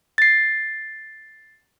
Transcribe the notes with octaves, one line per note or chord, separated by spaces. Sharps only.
A6 C7